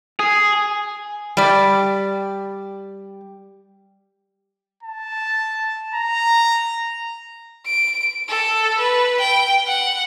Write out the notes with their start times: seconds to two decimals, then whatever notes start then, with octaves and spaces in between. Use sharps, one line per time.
0.19 G#4
1.37 G3 D5
4.83 A5
5.95 A#5
7.66 D7
8.28 A4
8.79 B4
9.20 G5
9.67 F#5